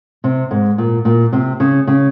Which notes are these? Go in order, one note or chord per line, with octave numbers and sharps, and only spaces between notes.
C3
G#2
A#2
A#2
C3
C#3
C#3